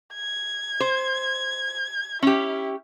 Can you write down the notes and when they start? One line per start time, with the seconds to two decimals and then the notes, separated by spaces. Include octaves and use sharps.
0.14 G#6
0.80 C5
2.23 C#4 E4 G4